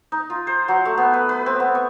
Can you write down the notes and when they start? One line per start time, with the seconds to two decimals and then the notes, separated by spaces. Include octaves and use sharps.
0.12 D#4
0.30 F4
0.47 C5
0.68 F#3
0.85 A3
0.98 B3
1.14 B4
1.29 B4
1.46 C4
1.60 B3
1.75 C#6